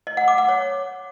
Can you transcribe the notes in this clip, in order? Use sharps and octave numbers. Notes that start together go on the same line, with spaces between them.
D#5
F#5
D6
F#5
C#5